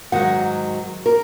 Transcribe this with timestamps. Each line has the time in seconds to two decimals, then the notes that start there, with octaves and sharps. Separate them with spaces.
0.12 G#2 D#3 F#3 F#5
1.06 A#4